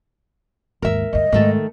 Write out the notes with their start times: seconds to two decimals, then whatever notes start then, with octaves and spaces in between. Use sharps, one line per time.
0.82 G#1 D#2 A#4 E5
1.13 D2 G2 D#5
1.32 G#2 D#3 A3 A4